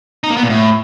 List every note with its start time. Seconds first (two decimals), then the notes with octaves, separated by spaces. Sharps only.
0.24 D#4
0.30 A#3
0.37 B3
0.43 A#2
0.49 A2